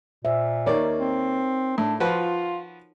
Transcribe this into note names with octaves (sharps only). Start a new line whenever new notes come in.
A#2 C5 E5
D#2 A#3 D#4 A#4 C#5 D5
C4
A2 D4
F3 F4 F#4 B4